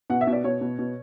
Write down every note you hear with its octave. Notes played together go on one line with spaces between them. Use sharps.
B2 F#5
E5
B2
D5
B2 C#5
B2
B2